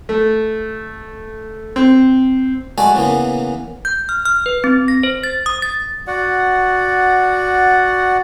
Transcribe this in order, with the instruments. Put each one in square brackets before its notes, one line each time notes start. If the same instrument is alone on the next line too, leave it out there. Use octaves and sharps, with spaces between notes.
[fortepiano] A3
C4
[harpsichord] G#3 A3 F#4 D5 G#5
C#3 E3 A#3 B3
[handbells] G6
F6
F6
B4
C4
A#6
C5
A6
D#6
A6
[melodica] F#4 D5 F#5